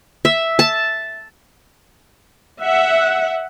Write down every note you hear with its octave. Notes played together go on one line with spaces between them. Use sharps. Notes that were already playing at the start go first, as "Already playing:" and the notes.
E5
A5
E5 F#5